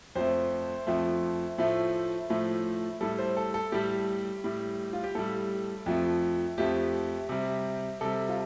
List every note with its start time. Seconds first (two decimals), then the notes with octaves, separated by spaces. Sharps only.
0.15 F2 F3 A3 C5
0.87 F2 F3 A3
1.58 A2 F3 A3
2.30 A2 F3 A3
3.01 A2 G3 A4
3.18 C5
3.37 A4
3.54 A4
3.72 A2 G3 G4
4.44 A2 G3
4.93 F4
5.04 G4
5.15 A2 G3 A4
5.86 F2 F3 A3
6.58 F2 F3 A3 G4
7.29 C3 G3
8.01 C3 G3 A4
8.29 F4